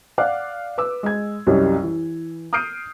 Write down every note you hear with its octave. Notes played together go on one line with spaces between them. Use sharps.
D5 F5 F#5 D6 F#6
B4 D6 E6
G#3 G#6
C2 F#2 G3 C#4 C#5 D#5
E3
D#6 F6 G6 C7 D7 D#7